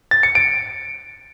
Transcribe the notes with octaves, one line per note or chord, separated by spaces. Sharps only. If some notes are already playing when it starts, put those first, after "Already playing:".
A6
C#7
D7